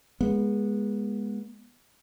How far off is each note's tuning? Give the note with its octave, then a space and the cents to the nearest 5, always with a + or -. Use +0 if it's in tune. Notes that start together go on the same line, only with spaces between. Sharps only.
G#3 -5 B3 -25